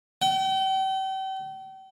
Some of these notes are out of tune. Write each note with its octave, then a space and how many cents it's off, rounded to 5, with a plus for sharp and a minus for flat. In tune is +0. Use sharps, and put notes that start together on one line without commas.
G5 -40